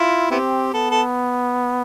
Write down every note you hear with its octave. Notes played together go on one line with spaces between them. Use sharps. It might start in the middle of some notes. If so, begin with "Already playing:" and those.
Already playing: E4 F4
B3 C4 E4 G4
B3 A4
A4